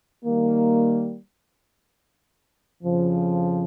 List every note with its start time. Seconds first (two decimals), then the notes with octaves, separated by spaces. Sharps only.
0.25 D#3 G3 A#3
2.84 F2 C#3 F3